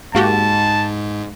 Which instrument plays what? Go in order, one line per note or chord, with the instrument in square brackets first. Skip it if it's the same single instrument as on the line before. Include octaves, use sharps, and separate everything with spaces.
[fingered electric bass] G#2 [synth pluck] A#3 F#4 G4 [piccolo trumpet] A5